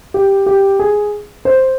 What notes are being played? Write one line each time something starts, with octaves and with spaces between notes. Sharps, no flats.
G4
G4
G#4
C5